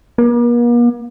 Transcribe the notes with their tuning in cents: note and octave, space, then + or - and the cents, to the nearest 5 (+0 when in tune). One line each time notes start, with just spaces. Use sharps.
A#3 +45